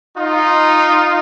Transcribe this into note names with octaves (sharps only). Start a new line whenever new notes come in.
D#4 F4